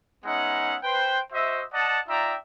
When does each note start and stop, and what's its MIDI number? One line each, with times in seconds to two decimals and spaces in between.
0.25 0.76 56
0.25 0.76 59
0.25 0.76 61
0.25 0.76 63
0.25 0.76 76
0.25 0.76 78
0.83 1.20 71
0.83 1.20 72
0.83 1.20 79
1.33 1.63 66
1.33 1.63 72
1.33 1.63 75
1.33 1.63 76
1.73 1.99 74
1.73 1.99 75
1.73 1.99 78
1.73 1.99 81
2.08 2.35 63
2.08 2.35 65
2.08 2.35 74
2.08 2.35 76
2.08 2.35 79
2.08 2.35 82